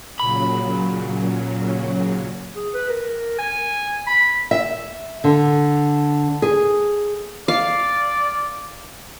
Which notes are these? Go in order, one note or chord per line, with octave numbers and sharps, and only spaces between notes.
A#2 C#3 F#3 B5
G#4
B4
A#4
G#5
B5
E5
D3
G#4
D5 F5